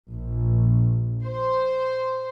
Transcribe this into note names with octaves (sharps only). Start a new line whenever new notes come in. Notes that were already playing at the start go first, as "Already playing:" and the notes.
A#1
C5